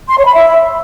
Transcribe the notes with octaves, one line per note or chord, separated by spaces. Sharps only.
C6
C#5
B5
E5